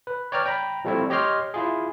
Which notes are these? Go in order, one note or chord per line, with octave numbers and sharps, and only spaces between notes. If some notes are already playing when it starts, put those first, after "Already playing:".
B4
C#5 D5 G5 A#5 F6
G5 A#5 B5
F3 G3 A3 C4 E4 F4
G4 C#5 D#5 G5 C6 F6
E4 F4 G#4